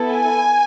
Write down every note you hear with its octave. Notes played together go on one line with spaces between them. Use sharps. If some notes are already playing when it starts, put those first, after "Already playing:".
Already playing: B3 E4 A4
G#5